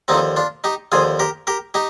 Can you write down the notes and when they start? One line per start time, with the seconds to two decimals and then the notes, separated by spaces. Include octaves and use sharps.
0.08 D#2 D3 F3 C4 D#4
0.36 D4 F4
0.64 D#4 G4
0.92 D#2 D3 F3 F4 G#4
1.19 G4 A#4
1.47 G4 A#4
1.74 D#4 G4